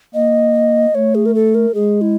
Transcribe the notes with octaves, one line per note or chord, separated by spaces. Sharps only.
A#3 D#5
A3 C#5
G#4
A#4
A4
A#4
G#3 G#4
E4